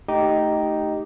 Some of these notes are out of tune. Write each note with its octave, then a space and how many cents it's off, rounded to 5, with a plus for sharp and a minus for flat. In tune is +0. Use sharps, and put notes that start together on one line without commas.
A3 +0 D#4 +0 G4 -10